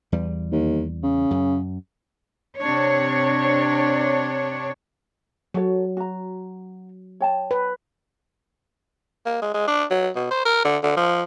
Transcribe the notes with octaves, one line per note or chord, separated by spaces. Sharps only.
E2 G3
D#2
C#3
F#2
C3 D4 C#5
F#3 F#4 A4 C#5
F#4 A#5
C#5 G5 A5
B4
A#3
G#3
G#3
D4
F#3
B2
C5
A#4
D3
D3
F3